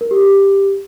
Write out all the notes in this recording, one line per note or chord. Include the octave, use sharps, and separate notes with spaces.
A#4
G4
G4